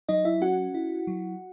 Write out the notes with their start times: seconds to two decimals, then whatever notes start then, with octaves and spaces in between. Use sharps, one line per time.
0.09 F#3 D#4 D#5
0.25 E4 E5
0.41 C#4 F#4 F#5
0.74 E4
1.07 F#3